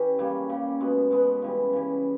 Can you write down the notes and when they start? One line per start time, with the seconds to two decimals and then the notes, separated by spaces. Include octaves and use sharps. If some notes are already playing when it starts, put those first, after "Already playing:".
Already playing: E3 C#4 E4 G4
0.19 C#3 G3 A#3
0.49 C#3 G3 A#3
0.80 B2 G#3 B3
1.11 B2 G#3 B3
1.42 C#3 E3 G3
1.73 C#3 E3 G3